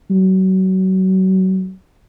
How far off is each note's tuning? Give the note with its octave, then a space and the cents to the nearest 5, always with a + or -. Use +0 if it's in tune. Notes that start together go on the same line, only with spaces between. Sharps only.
F#3 +30